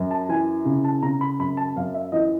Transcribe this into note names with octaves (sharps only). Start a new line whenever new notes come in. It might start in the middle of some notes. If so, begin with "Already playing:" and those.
Already playing: F#2
A5
E3 G#5
C#3
A5
C#3 A#5
B5
F#2 B5
A5
F#2 F5
E5
E3 D#5